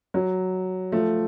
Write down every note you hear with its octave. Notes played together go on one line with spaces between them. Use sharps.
F#3
F3 A3